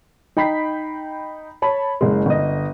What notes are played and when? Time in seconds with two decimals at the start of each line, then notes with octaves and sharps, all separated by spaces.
0.37 D#4 G5 B5 B6 C7
1.62 C#5 A5 B5
2.01 F#1 G#3
2.26 G1 D#5